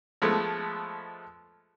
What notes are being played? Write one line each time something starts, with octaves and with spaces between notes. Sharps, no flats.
F3 G#3 A3 B3